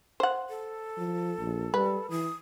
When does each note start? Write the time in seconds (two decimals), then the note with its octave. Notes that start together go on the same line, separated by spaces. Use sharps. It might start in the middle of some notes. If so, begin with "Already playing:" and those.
0.20 C5 F#5
0.50 A4
0.97 F3
1.38 A#1
1.74 G3 B4
2.10 E3 D#6